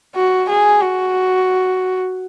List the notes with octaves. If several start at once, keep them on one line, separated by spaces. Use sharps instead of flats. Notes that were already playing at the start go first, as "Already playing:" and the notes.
F#4
G#4
F#4